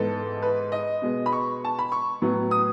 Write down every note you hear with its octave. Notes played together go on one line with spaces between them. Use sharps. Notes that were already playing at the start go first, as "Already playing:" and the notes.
Already playing: G#2 E3 B3 A4
B4
D#5
B2 G#3 B3
B5
C#6
A5
B5
C#6
A2 F#3 B3
D#6